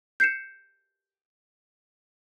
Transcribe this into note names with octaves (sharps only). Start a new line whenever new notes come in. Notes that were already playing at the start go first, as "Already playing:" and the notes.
G6 C7 C#7 E7